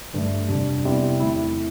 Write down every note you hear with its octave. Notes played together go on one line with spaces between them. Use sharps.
G2 D3 A3
G1 F2 C3 G3 D4
C3 G3 B3 E4
E2 D3 A3 C4 E4